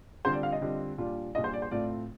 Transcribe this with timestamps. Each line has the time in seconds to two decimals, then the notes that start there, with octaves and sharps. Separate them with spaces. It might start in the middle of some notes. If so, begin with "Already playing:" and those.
0.24 D3 G3 C4 F4 C5
0.33 D5
0.43 F5
0.52 D#5
0.61 D3 G3 C4 F4
0.98 A#2 G3 D4 F4
1.35 A#2 G3 D4 F4 D#5
1.44 C5
1.53 D5
1.62 C5
1.71 A2 A3 C4 F4 D5